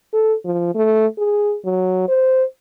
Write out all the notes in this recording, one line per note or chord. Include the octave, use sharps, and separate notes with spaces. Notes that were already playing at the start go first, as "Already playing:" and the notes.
A4
F3
A3
G#4
F#3
C5